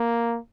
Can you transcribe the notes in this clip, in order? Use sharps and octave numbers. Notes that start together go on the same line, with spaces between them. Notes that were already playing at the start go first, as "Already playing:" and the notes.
Already playing: A#3